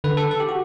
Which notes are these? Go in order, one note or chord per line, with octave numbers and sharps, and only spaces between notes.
D3 B4
A4
A4
G4
F#4